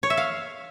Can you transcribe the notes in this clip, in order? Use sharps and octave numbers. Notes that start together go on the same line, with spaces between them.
C#5
E5
F5